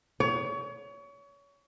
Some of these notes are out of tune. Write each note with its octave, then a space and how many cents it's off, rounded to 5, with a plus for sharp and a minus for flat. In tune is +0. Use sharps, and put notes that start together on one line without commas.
C#5 +30